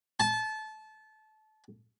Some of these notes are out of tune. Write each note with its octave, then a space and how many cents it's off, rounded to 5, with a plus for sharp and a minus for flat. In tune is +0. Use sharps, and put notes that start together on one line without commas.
A5 -25